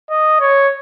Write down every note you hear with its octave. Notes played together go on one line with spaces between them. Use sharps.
D#5
C#5